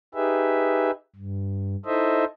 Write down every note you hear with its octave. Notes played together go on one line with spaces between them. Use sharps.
D#4 G4 G#4 B4 E5
G2
D#4 E4 A4 C5 D#5 E5